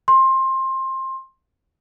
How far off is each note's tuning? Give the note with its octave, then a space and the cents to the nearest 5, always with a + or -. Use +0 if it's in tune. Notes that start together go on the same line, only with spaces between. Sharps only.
C6 +20